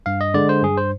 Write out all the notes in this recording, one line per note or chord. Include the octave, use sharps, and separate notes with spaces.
G2 F5
D#5
D3 G#3 D5
C5
G2 G#4
C5